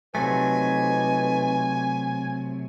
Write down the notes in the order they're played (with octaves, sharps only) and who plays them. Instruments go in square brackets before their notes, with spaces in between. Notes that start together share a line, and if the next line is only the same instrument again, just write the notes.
[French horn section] F2 D#4 B4 [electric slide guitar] C3 F#3 A3 [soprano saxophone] G#5